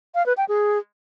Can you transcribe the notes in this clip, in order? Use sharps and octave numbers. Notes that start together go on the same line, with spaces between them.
F5
B4
G5
G#4